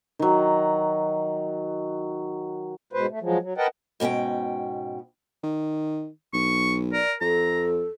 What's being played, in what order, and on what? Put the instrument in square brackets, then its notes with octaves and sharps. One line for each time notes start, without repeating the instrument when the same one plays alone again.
[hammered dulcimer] D#3 F#3
[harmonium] G#2 B2 B4 C5
A3
F3 F#3 G#3
F#3
A#4 B4 D#5 F#5 G5 A5
[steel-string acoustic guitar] G#2 B2 E3 C#4 G5
[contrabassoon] D#3
[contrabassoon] B1 [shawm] C#6
[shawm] A#4 [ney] D5
[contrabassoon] F2 [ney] A4 [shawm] A#5